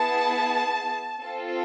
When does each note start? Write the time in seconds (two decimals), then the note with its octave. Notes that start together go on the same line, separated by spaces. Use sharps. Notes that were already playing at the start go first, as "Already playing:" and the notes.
Already playing: B3 E4 G#4 A5
1.22 C4 F4 A4